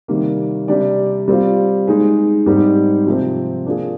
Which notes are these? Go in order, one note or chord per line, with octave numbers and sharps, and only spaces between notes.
C3 D#3 G3 A#3
C3 G3 D4 G4 D5
G3 C4 F4
G#3 D#4 G#4
G#2 G3 C4 D#4 G4
C3 F3 C4
A#3 D4 F4 G#4